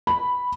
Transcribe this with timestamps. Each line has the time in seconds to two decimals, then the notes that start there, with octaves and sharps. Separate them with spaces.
0.07 B5